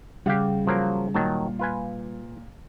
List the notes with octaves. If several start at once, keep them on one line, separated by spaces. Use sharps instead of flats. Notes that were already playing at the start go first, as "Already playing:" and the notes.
C#3 G3 G4 F5 F#5
F3 F#3 A#3
A#2 D#3 F#3 A5
F4 B4 G#5